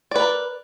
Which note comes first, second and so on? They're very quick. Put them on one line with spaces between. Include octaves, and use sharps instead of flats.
D5 B4 A#4